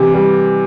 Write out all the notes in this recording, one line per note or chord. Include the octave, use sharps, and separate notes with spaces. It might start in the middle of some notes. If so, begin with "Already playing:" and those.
Already playing: C3 E3
G3